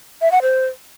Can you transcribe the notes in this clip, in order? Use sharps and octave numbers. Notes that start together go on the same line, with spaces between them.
E5
F#5
C5